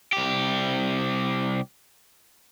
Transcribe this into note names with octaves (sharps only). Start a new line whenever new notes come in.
C2 G4